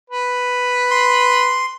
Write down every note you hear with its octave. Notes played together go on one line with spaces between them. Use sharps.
B4
C6